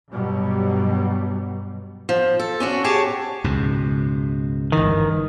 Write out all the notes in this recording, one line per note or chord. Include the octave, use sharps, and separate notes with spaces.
G2 B2 F#3 G3
F3
A4
C#4 D4 F#4
G4 G#4 C#5 G#5 A5
C#2 G#2 B2
G1 D#3 E3